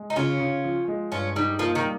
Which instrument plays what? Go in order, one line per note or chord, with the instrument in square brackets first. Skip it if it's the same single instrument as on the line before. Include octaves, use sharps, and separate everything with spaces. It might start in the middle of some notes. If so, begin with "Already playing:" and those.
Already playing: [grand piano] G#3
[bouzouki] D#4
[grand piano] C#3 [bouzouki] C#4 F4
[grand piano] C#3
F3
G#3
[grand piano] G2 [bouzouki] C#4 F4
[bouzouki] G3 [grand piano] D#4
[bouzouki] F3 [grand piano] A#3
[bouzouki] D#3
[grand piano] G3